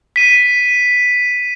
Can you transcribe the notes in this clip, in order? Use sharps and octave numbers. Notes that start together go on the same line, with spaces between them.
B6 D#7